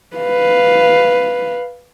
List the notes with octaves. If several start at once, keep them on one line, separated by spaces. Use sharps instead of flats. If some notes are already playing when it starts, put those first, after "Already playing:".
B4 F5